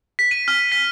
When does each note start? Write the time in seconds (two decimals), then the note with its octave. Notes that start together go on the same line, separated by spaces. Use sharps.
0.19 B6
0.31 D#7
0.48 F6
0.72 B6